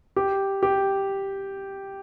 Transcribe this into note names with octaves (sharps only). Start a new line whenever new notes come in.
G4
G4